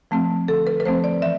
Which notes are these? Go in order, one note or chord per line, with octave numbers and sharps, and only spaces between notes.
F3 A3 C4
D3 A4
B4
B4
F3 A3 C4 C5
D5
E3 E5